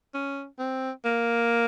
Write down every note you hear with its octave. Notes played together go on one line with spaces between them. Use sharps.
C#4
C4
A#3